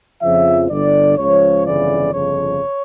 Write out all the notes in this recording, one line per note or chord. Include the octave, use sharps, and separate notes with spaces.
F2 C#3 F3 E5
G1 G2 D3 D5
C#2 C#3 F3 C#5
G1 F2 C#3 E3 D5
G1 F2 C#3 F3 C#5